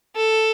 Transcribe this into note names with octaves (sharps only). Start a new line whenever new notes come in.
A4